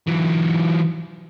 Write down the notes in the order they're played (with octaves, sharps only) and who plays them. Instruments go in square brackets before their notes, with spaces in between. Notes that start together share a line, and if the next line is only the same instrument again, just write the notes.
[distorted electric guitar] E3 F#3